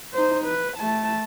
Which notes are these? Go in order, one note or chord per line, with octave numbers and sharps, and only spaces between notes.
D#4 C5
B4
A3 A5